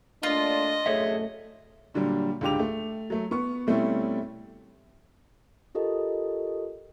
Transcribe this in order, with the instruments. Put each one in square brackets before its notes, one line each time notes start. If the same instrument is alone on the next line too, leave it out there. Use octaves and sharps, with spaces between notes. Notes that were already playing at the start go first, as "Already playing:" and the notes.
[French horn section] A3 A#3 D4 [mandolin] F4 [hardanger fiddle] D#5
[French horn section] F#2 A2 A3 [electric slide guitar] G#4 C#5 E5
[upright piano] A#2 D3 F#3 G3
C#2 G#2 D3 G4 D6 F7
A3
F#3 A3
B3 C#6
B2 G3 A3 C4 C#4 E4
[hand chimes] F4 G4 A4 A#4 D#5